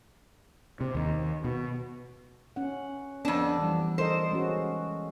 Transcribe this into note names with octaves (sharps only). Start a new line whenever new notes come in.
C3
D#2
B2
C#4 F#5
F2 B3 D4
E3 G3
A4 A#4 C5 D#5
G#3 C#4 F#4